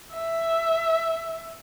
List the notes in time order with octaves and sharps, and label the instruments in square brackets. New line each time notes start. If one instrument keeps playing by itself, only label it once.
[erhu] E5